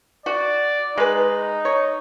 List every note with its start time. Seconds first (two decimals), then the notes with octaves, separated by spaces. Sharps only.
0.26 F#4 D5
0.98 G#3 D#4 B4
1.65 C#5